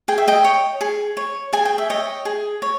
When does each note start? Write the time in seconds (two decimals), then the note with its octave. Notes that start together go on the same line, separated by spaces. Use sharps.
0.08 G#4 G5
0.18 E5
0.28 D#5 G5
0.44 C#5
0.81 G#4
1.17 C#5
1.53 G#4 G#5
1.65 G5
1.78 E5
1.90 C#5 D#5 G5
2.25 G#4
2.62 C#5